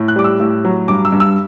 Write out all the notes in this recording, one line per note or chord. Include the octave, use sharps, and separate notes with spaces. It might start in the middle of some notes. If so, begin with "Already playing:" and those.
Already playing: A2
F#6
G3 D6
E6
A2
F#3
G2 D6
E6
G2
E6